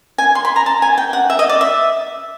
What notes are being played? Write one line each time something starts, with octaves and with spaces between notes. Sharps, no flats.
G#5
C6
B5
A#5
A5
G#5
G5
F#5
E5
D#5
D5
E5